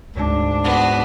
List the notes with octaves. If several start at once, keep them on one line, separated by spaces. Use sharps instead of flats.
D2 G#2 D4
B3 F#4